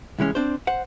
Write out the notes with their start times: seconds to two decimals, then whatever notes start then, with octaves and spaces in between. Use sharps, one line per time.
0.18 C2 E3 G#3 C#4
0.35 C4 D4 C5
0.67 C5 F#5